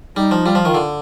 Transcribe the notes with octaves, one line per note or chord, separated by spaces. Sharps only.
G3 D#4
F3
G3 F4
F3
D#3
D3